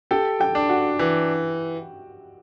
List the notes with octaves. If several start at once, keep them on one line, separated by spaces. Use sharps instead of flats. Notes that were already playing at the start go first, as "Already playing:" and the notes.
G4 A4 G5
G4 G5
D4
F#4 F#5
E3